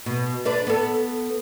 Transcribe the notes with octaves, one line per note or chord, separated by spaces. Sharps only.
B2
D4 B4 D5
B3 A4